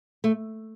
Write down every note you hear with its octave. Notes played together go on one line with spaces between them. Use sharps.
A3